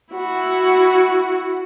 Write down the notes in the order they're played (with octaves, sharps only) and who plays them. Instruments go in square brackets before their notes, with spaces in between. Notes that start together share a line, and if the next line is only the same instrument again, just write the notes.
[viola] E4 F#4